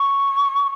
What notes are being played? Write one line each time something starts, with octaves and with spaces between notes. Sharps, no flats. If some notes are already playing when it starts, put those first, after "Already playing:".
Already playing: C#6